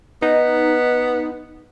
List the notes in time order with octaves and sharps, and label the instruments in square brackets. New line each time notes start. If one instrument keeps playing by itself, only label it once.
[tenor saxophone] B3 [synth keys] D#4